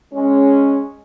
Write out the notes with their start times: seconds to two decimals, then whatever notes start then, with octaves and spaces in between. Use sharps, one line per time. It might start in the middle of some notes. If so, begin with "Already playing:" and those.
0.13 G#3 C#4